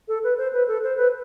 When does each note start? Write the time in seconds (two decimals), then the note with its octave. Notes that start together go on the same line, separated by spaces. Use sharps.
0.08 A4
0.24 B4
0.38 C5
0.53 B4
0.68 A4
0.83 C5
0.97 B4